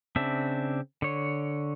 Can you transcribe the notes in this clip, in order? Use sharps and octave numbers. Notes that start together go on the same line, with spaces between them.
C#3 C4 D4 E5
D3 C#5